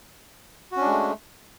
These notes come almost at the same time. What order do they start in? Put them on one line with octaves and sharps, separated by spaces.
F#4 C#4 D4 G#3 A3